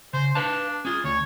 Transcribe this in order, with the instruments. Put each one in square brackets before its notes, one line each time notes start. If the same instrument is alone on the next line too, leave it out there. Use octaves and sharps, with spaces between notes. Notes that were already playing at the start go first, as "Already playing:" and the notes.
[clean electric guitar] C#3 [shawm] C5
[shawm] D4 [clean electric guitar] B4 F5 A5
[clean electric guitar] C#4 F4 [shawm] G#4
[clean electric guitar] D2 [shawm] C#5